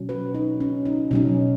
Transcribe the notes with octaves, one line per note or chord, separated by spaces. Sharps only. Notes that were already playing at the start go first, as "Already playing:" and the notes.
Already playing: B2 F#3 C#4
F#4 B4
D#4
C#4
D#4
B2 F#3 C#4 D#4